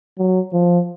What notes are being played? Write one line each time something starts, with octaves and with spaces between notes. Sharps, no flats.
F#3
F3